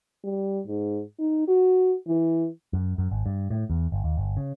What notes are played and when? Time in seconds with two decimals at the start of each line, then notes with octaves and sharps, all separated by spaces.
0.24 G3
0.67 G#2
1.19 D#4
1.48 F#4
2.07 E3
2.73 F#2
2.98 F#2
3.11 G#1
3.26 G2
3.50 A2
3.70 E2
3.92 G1
4.04 D#2
4.17 G1
4.37 C#3